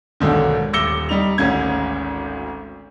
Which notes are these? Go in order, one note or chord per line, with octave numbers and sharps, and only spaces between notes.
B1 G#2 D3 D#3
D#1 D6 E6 A#6 C#7 G7
G3 D#4 F7
G#1 D2 G#2 C#4 G#6